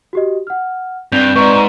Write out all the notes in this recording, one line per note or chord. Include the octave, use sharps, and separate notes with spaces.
F#4 G4 D#5
F#5 F6
G2 C4 G6 F7 G7
G#2 B4 D5 A#5 C#6